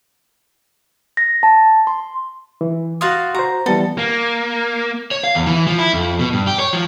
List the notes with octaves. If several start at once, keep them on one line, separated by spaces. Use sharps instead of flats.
A#6
A5
C6
E3
F#4 F5 C6 D#6 A6
F#4 C5 A#5
E3 G3 B3 A4
A#3
C#5
F5
E2
E3
F3
E4
F2
B2
G2
G4
C#5
F3